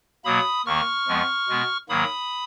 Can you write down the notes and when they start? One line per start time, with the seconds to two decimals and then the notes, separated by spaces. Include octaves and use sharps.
0.24 B2 F#3 A#3 B5 D#6
0.66 D#2 D#3 A#3 C#6 F6
1.08 F2 F3 G#3 B3
1.49 B2 G#3 B3
1.89 G#2 D#3 F#3 A#3 B5 D#6